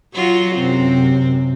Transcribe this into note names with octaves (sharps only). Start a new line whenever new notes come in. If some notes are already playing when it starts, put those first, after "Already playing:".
F#3 F4 F#4
F#2 C3 C4